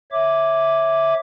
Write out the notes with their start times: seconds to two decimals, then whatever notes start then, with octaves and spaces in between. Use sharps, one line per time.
0.12 C#5 E5 D6